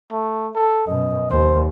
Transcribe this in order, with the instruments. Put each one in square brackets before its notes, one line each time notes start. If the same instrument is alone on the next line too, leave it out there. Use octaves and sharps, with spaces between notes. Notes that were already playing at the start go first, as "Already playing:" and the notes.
[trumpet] A3
A4
[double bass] F#2 B2 [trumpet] D#5
[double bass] D#2 [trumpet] C5